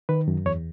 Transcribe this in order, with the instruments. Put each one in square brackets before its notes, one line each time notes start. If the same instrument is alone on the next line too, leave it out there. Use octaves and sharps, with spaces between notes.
[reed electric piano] D#3 B4
F#2
E2 C#5